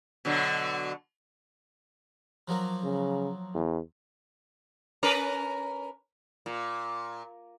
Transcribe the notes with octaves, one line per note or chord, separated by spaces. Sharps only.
B2 D3 F#3
F3 F#3 A#3
C#3
E2
C#4 A#4 B4
A#2